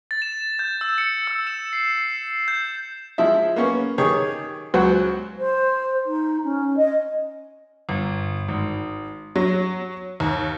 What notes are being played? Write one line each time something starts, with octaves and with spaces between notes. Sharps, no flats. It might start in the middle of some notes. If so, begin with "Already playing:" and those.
A6
E7
G6
E6
C#7
E6
E7
C7
C7
G6
F3 G#3 E4 E5
A#3 B3 C#4
D#3 G4 G#4 C#5
C#2 F#3 F#4 C5
C5
D#4
C#4
D#5
G1
G#1
F#3
D#2